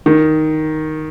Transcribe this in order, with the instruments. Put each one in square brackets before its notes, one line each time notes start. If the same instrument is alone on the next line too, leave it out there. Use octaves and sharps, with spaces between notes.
[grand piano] D#3